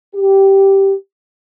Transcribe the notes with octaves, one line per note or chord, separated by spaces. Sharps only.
G4